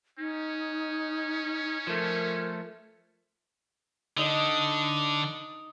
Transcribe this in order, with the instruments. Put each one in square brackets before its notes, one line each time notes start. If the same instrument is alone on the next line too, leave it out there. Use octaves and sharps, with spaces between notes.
[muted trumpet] C#4 [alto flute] D#4
[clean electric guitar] F3 A3 [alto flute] A#4
[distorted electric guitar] D3 [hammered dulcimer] D#4 D#5